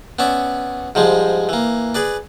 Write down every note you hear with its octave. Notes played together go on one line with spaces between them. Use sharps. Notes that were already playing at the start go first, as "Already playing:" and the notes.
B3 C#4 D5 E5
G#2 F3 G3 G#3
E3 A#3
G#4 B4 D5